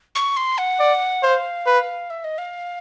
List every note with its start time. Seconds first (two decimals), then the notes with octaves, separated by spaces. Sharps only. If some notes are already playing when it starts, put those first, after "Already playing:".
0.15 C#6
0.37 C6
0.58 F#5
0.80 D5
1.23 C5 F5
1.66 B4
2.10 E5
2.24 D#5
2.38 F5